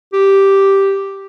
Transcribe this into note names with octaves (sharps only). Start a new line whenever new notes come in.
G4